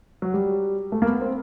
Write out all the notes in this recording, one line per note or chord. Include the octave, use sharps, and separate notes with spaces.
F#3
G3
A3
A#3
B3
C4